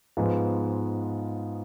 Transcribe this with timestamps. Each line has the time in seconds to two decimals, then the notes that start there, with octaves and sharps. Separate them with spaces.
0.17 G#2 F3 G#3 B3